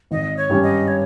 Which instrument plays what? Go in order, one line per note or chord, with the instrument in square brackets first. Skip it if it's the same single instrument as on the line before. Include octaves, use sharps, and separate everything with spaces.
[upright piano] G#1 [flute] D#5
[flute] C#5
[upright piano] G2 G3 C#4 G4
[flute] D#5
C#5